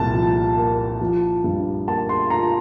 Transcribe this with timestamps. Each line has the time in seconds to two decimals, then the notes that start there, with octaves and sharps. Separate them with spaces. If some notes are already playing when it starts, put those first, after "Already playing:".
Already playing: C2 A#2 A5
0.13 F3
0.57 A#3
1.01 F3
1.44 G2
1.88 A#3 A5
2.09 C6
2.30 F4 A#5